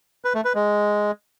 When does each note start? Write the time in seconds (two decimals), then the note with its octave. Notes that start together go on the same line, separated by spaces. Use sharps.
0.25 B4
0.35 A3
0.45 B4
0.55 G#3